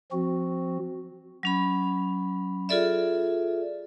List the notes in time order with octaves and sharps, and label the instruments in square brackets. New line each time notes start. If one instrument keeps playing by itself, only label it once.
[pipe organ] F3 C4 F#4
[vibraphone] F#3 C#4 B5
F4 G#4 A4 D5 E5